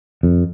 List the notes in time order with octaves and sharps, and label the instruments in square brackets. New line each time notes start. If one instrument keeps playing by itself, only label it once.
[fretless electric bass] F2